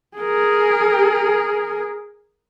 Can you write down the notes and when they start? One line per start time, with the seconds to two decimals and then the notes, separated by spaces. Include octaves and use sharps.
0.17 G#4 A#4